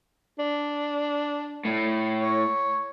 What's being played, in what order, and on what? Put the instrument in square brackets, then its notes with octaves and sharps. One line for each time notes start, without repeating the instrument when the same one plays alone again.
[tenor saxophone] D4
[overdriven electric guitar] A2
[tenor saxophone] C#5